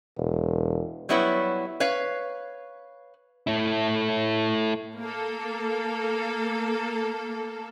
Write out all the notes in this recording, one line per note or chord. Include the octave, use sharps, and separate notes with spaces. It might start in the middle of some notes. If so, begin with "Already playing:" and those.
E1
F#3 G3 B3 E4 B4 C#5
B4 C#5 F5
A3 E4
A#3 A4